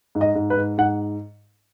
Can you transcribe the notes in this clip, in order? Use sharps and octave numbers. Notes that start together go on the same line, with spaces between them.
G#2
D#5
G#2
B4
G#2
G#2 F#5